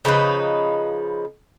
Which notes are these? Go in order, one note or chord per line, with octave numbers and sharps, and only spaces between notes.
C#3 F3 D#4 B4